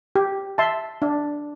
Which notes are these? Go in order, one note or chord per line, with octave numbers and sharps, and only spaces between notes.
G4
E5 A5 C6
D4